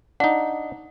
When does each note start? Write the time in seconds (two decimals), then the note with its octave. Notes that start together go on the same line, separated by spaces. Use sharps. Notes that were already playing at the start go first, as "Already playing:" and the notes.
0.20 D4 D#4 F#5